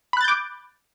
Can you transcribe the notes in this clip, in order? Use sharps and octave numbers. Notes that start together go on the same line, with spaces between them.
B5 D6 F#6 G6 A6